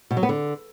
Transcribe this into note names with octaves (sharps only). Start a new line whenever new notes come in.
B2
F#3
B3
D3